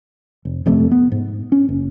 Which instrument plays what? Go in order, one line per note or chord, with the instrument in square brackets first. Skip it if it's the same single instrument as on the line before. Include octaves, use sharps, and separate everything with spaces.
[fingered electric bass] F1
D#1 F2 C3 A3
B3
G#2
C#4
F#1